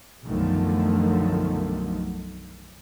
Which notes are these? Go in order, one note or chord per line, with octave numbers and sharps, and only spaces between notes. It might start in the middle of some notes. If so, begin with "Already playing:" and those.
B1 F#2 D3 D#3 F3 A3